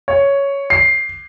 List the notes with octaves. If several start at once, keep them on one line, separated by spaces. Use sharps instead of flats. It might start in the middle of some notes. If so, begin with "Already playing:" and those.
C#5
C7